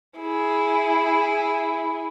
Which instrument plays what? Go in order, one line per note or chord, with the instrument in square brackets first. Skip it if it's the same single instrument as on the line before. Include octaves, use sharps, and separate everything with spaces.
[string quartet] E4 G#4